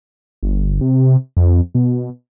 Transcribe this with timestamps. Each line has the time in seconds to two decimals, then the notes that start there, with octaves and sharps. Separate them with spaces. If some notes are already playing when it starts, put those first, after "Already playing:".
0.43 G1
0.81 C3
1.37 F2
1.75 B2